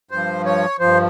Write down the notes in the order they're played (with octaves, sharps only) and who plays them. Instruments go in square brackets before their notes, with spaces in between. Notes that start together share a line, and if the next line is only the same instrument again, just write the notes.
[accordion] G2 F3 C5
C#5
G2 F3 C5